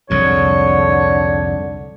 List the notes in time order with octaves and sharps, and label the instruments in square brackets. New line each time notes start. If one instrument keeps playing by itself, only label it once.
[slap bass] C2 F2 G#2 [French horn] D3 [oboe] C#5